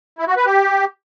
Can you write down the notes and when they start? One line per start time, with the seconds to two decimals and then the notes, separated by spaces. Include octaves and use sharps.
0.19 E4
0.28 F#4
0.37 B4
0.46 G4